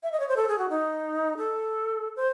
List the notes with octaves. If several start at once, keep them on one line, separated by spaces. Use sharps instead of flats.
E5
D#5
C#5
C5
A4
G#4
F#4
D#4
A4
C5